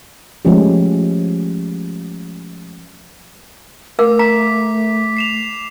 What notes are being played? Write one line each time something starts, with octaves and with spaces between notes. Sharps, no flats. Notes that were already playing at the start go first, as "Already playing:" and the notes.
F3 G#3 A3 C#4 G4
A3 A#4 F5 D6
A#5 B6
C7 E7 F7